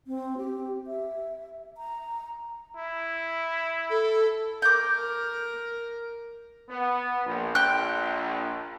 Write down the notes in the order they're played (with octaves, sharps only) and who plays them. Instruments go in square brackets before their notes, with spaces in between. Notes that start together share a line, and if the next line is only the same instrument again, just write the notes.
[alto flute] C4
G4
E5
A#5
[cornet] E4
[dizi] A4
[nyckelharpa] A#4 [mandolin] D6 G6
[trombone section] B3
A#1
[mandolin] G5 F#6